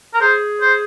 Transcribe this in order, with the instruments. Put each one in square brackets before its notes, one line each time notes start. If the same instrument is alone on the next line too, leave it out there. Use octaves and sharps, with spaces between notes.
[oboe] A#4
[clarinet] G#4 [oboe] C5
[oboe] C5